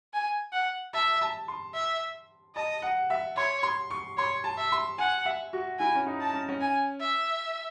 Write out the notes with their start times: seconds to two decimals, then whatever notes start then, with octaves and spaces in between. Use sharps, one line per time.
0.14 G#5
0.53 F#5
0.93 E5 A5
1.21 A5
1.48 C6
1.74 E5
2.55 D#5 A5
2.82 F#5
3.10 E5
3.37 C#5 C6
3.63 C6
3.90 C#6
4.17 C#5 C6
4.44 A5
4.58 E5
4.72 C6
4.98 F#5 G#5
5.25 E5
5.53 F#4
5.79 E4 G#5
5.95 C#4
6.06 D#4
6.20 A5
6.33 C#4
6.49 C#4
6.61 G#5
7.00 E5